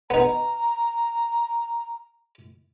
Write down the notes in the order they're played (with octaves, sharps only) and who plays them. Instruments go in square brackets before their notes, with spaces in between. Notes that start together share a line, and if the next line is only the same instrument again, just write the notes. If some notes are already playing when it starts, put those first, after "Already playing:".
[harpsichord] B3 D#4 [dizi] A#5